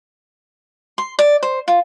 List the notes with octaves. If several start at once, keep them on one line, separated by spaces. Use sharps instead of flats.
C6
D5
C5
F4